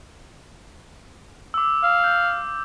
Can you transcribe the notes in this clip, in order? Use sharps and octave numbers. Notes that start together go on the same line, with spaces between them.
D6 E6
F5
G6